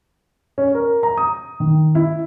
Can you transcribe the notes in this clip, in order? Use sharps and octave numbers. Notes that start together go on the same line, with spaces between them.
C#4
A#4
A#5
D#6
D#3
E4